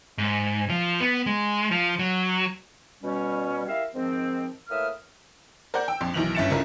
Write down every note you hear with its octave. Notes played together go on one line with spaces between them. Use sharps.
G#2
F3
B3
G#3
F3
F#3
B2 G3 C#4
E4 G4 A#4 E5 F5
G#2 D#3 F3 C4
A2 A#3 B4 E5 D#6 F6
A#4 C5 D5 F#5 G6
G5 E6
A#1 F2 C6
B1 D#3 E3 F7 F#7
G1 C#4 E4 A6 C#7 E7
C#2 D3 C#4 E4 A#4